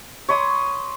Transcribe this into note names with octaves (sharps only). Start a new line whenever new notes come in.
C#5 B5 C6 D#6